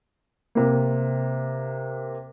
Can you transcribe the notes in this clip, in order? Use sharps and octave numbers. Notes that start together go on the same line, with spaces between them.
C3 A#3